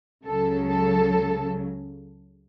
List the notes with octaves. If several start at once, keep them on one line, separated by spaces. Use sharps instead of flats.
C#2 C#3 F#3 A4
A4